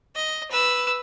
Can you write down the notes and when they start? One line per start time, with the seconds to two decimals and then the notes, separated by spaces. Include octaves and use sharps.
0.16 D#5
0.51 B4 E6